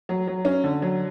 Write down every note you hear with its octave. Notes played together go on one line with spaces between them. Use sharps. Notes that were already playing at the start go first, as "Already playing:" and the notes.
F#3
F#3
C#4
D3
F#3